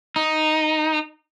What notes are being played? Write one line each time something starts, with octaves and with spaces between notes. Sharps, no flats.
D#4